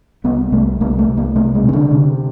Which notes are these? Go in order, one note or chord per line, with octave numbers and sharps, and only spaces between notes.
C2 B3
C2 A3
C2 A#3
A3
C2
A#3
C3 A3
G#3
C3
D#3
D3
C3